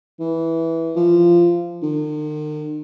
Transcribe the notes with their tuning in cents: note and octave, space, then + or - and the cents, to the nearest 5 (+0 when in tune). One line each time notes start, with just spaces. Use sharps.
E3 -10
F3 -15
D#3 -45